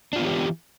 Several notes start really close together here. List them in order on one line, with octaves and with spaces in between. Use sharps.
D4 F4 B3 E3 G4